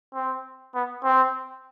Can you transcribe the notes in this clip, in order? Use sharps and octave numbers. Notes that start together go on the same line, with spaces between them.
C4
B3
C4